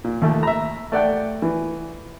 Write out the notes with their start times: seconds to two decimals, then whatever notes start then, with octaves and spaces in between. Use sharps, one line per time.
0.04 A#2
0.22 D#2 A#2 A3
0.43 E5 A#5
0.92 A3 D5 F#5 G5
1.42 E3